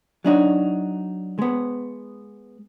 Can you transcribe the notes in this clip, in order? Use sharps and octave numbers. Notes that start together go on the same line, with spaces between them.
F#3 D4 D#4 F#4
G#3 B3